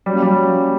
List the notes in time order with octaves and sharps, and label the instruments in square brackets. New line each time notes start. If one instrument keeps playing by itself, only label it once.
[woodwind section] F#3 A#3 C#4 [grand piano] G3
[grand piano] G3